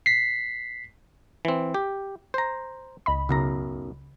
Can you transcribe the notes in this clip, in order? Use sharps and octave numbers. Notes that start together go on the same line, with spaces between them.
B6 C7
E3 C4
G4
C5 A#5
C#2 D#5 B5
B1 F#2 C#3 A#5